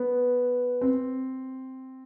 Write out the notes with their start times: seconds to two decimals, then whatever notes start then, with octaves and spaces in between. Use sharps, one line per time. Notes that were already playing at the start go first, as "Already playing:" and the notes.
Already playing: B3
0.81 C4